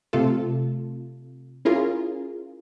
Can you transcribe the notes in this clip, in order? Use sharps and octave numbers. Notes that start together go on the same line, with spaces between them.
C3 A3 F4 A4
C#4 E4 F4 G#4 A#4